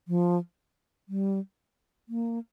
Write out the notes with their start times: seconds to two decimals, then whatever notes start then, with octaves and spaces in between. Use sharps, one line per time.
0.08 F3
1.09 G3
2.09 A#3